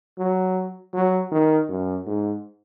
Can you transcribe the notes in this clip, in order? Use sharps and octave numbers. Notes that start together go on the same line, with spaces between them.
F#3
F#3
D#3
F#2
G#2